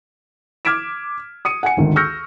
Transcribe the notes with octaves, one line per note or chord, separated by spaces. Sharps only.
D6 F6 G#6 B6 D7 E7
D#6 C#7 D#7
F#5 G#5 C#7
G#1 D2 D#3
C#6 E6 F6 G6 A#6 C#7